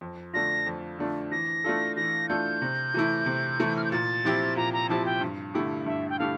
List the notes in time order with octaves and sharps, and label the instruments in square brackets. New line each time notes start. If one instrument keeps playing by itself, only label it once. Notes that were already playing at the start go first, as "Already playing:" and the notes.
[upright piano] F2
[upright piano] D3 A3 D4 F4 [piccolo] A#6
[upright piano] F2
D3 A3 D4 F4
[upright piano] E3 [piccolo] A#6
[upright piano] A3 D4 F4 A4
[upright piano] E3 [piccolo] A#6
[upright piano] A3 D4 F4 A4 [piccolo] G6
[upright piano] C3
E3 A3 E4
C3
E3 A3 E4
[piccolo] F6
G6
[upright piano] A#2 [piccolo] A6
[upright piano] F3 C4 E4 G4
[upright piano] A#2 [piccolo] A#5
[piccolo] A#5
[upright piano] F3 C4 E4 G4 [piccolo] A5
[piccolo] G5
[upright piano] G2
D3 A3 E4 G4
[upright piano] G2 [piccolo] E5
[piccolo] G5
[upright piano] D3 A3 E4 G4 [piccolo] F5